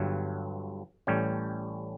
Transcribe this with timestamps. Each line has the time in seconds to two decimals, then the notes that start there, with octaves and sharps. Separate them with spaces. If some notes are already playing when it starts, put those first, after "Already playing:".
Already playing: G1 G2 F#3
1.07 A1 A2 G3 C#4